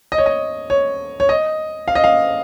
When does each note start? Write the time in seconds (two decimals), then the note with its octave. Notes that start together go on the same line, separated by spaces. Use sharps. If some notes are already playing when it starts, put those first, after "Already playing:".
0.12 D#5
0.18 C#5
0.26 D#5
0.70 C#5
1.20 C#5
1.29 D#5
1.88 F5
1.95 D#5
2.04 F5